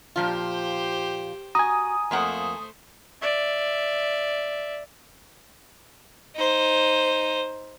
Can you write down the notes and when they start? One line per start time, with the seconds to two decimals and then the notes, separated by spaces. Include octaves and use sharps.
0.16 A#2 F3 F4 G4 C5
1.55 F#4 G#5 A#5 D#6
2.11 F2 A3 A#3 C5 F#5
3.21 D5 E5
6.36 D#4 C5